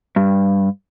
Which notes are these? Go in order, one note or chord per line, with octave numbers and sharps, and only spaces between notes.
G2